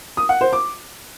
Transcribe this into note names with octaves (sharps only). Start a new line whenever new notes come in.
D#6
F#5
C5
D6